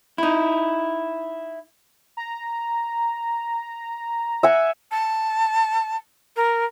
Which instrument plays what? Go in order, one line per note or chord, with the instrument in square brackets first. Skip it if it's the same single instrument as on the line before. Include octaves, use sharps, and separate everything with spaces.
[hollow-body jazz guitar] D#4 E4
[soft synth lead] A#5
[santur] E5 F#5 G#5
[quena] A5
A#4